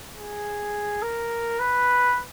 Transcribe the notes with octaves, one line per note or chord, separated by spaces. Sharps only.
G#4
A#4
B4